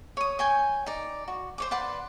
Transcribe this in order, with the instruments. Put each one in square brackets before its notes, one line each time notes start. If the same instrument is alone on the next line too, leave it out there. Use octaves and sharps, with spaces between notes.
[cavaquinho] C#5 D#6
C#5 G5 G#5
D#4 D5
F#4
C5 C#5 D6
B4 D5 F#5 C6